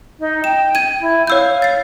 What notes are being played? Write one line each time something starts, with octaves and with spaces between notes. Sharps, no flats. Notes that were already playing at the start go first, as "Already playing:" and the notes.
D#4
G5 E7
G#6 D#7
E4
C#5 F5 E6 G6
A6 C7